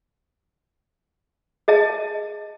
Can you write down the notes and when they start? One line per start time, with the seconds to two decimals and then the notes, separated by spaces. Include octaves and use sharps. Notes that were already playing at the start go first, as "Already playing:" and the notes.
1.68 G#4 D#5 A5